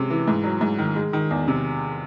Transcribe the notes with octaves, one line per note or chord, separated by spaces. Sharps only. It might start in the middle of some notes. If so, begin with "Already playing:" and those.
Already playing: C3 G#3 C#4
E3
G#2
F#3
G#2
D#3
G#3
D#3
E2
C3